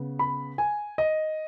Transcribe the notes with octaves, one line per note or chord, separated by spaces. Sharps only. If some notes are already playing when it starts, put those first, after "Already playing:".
Already playing: C#3 B3
B5
G#5
D#5